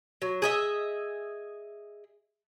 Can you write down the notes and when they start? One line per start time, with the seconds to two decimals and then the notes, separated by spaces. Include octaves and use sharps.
0.22 F#3
0.42 G#4 D#5 E5